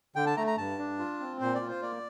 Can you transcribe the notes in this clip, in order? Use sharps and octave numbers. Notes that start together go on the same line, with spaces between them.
D3 G5
A5
A3 A#5
A#5
G2 A5
D4
F4
C4
A#2 C5
D5
F4
C5
A#3 D5